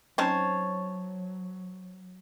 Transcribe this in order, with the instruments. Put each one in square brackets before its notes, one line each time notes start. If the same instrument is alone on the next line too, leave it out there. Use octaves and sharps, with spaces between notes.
[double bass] F#3 [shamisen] C4 C#4 D#4 [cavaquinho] C5 C#5 A5